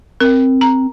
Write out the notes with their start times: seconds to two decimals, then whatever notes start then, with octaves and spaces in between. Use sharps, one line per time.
0.20 C4 A#4
0.61 A#5